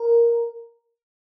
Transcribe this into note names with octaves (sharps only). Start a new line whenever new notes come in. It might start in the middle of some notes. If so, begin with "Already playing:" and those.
Already playing: A#4